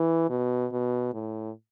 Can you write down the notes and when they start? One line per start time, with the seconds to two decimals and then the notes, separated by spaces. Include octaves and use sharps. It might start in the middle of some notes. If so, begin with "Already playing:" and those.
Already playing: E3
0.30 B2
0.72 B2
1.13 A2